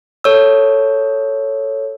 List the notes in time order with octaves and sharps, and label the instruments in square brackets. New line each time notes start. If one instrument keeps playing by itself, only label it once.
[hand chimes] A4 C#5 E6